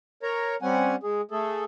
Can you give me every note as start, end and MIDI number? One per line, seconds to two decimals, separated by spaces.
0.23 0.56 70
0.23 0.56 73
0.23 0.56 82
0.62 0.95 55
0.62 0.95 60
0.62 0.95 61
0.62 0.95 78
0.62 0.95 80
1.03 1.21 56
1.03 1.21 68
1.31 1.64 57
1.31 1.64 68
1.31 1.64 69